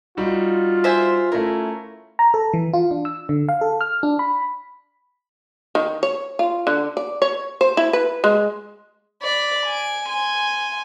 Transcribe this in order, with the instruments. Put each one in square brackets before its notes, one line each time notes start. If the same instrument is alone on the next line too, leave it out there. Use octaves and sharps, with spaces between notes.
[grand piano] G3 D#4 F#4 [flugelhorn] F4
[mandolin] C5 E5 G#5
[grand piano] A3 C#4 E4 [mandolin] A#4
[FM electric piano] A#5
A4
E3
F4
D4
E6
D3
F5
A4
F6
D4
B5
[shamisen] D#3
C#5
F4
D3
D5
C#5
C5
E4
B4
G#3
[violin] D5 B5
G#5 D7
G#5 C6